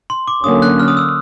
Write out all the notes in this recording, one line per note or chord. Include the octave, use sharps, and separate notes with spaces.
C6
D6
D3 F#3 A#3 C#4 D#6
F#6
F6
D#6
E6